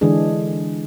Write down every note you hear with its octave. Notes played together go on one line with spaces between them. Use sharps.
D3 E3 G#3 D4 G#4